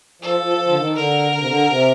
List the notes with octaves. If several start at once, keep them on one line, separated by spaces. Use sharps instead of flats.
F3 A4
F3
F3
D3
D#3
D3 A#4
D3
C3
D3
C3